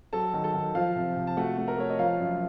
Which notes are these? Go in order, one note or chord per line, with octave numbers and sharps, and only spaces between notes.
F#3 A4 A5
D#3
A4 A5
D#3
F3 F4 F5
C3
C3
A5
A3 F#4 F#5
A3
A#4 A#5
A3 C#5
D#5
F3 F4 F5
F#2